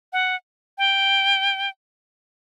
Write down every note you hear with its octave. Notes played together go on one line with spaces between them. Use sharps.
F#5
G5